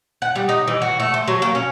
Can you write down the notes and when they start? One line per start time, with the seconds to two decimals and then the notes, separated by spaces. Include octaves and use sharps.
0.22 F#5
0.35 G3
0.49 D#4
0.67 E3
0.82 F#4
1.00 A3
1.14 C5
1.28 F#3
1.42 A#3
1.55 C#4